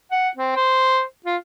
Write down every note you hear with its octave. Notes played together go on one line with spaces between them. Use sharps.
F#5
C4
C5
F4